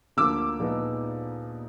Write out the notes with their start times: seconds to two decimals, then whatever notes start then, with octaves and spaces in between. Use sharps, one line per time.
0.17 D2 D3 F3 A#3 D6 E6
0.59 A#2 F3 G#3 B3 D#4